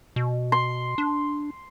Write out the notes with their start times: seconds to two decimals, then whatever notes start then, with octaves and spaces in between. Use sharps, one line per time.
0.16 B2
0.52 C6
0.98 D4